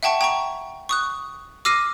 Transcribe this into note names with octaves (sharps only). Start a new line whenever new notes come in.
E5 F#5 G5 A5 C#6
G5 A#5 C#6
C#6 D#6 F#6
D6 E6 F6 A#6 C7 D#7